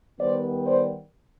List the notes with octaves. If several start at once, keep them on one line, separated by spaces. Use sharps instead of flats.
D#3 G3 B3 C5 D5
C5 D5